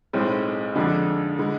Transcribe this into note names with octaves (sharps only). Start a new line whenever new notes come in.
B1 A2 G#3 C4
F2 D3 G#3 D4
D3 G#3